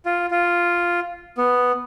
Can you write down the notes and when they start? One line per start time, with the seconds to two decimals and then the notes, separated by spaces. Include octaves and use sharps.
0.06 F4
0.31 F4
1.38 B3